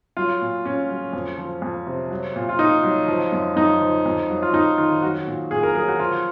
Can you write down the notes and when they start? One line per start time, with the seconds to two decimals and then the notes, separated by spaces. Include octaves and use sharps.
0.17 F#3 F4
0.41 A#2
0.65 A#2 C#4
0.89 F#3
1.13 F2
1.37 F3
1.62 F2
1.87 C3
2.11 F#3
2.36 A#2
2.49 F4
2.59 A#2 D#4
2.83 F#3
3.08 F3
3.32 F#2
3.56 F#2 D#4
3.81 F3
4.06 F2
4.30 F#3
4.42 F4
4.53 F2 D#4
4.78 D#3 F4
5.02 F#3 F#4
5.27 A#2
5.51 A#2 G#4
5.63 A#4
5.75 F#3 G#4
5.88 F#4
5.99 F3 F4